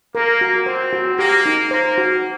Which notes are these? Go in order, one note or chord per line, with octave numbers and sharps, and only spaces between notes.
A#3 A#4
F#4
C4 C5
F#4
A#3 G4
D#4
A#3 C5
F#4